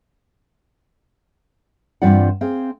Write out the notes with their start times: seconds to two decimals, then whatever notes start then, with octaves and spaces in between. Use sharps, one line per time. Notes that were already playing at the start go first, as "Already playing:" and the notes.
2.02 G2 E3 C4 F4 D5 F#5
2.41 C4 G#4 F5